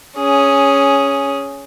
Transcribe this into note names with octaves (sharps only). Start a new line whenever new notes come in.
C#4 G#4